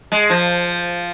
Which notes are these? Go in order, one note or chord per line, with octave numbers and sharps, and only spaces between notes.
G#3
F3